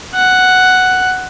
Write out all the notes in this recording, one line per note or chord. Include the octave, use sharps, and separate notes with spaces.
F#5